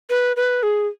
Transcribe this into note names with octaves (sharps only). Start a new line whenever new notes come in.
B4
B4
G#4